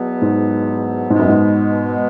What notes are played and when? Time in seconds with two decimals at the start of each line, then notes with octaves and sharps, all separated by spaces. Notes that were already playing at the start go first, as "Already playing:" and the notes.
Already playing: E2 B2 F#3 B3
0.22 G#2
1.10 G#2 B2 G#3 B3
1.19 F#2
1.28 G#2